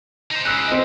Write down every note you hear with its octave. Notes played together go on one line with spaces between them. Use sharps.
D#4 C5
C#2 C#3 E6 F#6
C4 D#5